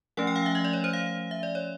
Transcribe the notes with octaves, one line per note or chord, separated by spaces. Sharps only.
F3 A3 C#4 F#5
G5
F5
E5
D#5
D5
C#5
C5
F5
E5
D5
C#5